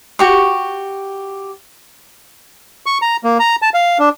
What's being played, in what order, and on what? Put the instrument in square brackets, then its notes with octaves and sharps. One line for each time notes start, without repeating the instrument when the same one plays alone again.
[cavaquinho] F#4 G4 C#6
[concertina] C#6
A#5
A#3
A#5
A5
F5
D4